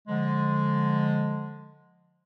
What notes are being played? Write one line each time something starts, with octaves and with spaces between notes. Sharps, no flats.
D3 F3 G#3